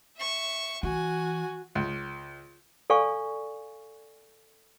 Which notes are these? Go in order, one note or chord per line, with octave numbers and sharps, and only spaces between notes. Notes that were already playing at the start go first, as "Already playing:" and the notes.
E5 C#6
E3 F#4 G#5
C#2
A4 D5 F5 G#5 C#6